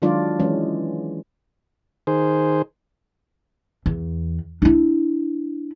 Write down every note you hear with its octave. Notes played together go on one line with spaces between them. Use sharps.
D#3 F#3 G#3 D4 F4 D5
E3 G#3 C#4
D#3 G#4 C5
E2
D4 E4